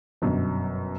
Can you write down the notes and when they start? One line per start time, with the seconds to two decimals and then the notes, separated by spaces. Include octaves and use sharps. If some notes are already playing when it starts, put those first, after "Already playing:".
0.22 G1 F#2 B2